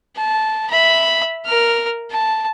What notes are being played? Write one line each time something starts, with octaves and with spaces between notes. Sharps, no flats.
A5
E5 B5
A#4 F6
A5